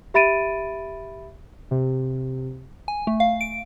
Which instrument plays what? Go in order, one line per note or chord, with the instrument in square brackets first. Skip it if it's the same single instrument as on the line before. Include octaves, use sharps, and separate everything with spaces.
[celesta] G4 E5 B5 A6 D7 D#7
[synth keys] C3
[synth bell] G#5
A3
F5
D7